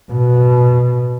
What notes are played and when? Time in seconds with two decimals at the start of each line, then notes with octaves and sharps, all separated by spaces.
0.12 B2